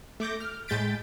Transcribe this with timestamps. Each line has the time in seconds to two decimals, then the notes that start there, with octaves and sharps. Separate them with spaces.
0.20 A3 D6 G6 A#6
0.40 F6
0.68 A2 G#3 G6 A6 B6 D7